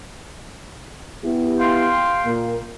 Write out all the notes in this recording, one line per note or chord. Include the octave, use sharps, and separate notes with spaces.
B3 E4 G4
F5 G5 C6
A#2 A#3